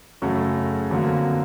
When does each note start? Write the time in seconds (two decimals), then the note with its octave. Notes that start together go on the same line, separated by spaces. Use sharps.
0.22 F#2 C#3 F#3 A3
0.91 F2 D3 F#3 A#3